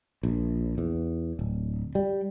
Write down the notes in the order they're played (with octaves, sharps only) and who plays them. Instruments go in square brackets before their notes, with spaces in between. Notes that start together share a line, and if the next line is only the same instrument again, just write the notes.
[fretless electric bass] A#1
E2
D1
G3